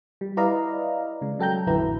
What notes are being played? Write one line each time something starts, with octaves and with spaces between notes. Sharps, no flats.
G3
E4 B4 D5 D#5 F5 A#5
C#3 G#3
F#3 A4 G5 A#5 G6
A1 F2 D3 E4 B4 A#5